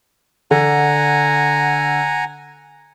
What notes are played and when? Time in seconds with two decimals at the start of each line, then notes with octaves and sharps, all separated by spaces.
0.51 D3 F#5 G#5 A#5